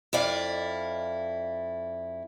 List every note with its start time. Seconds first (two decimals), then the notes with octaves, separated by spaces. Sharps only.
0.13 F2 E4 D5 F5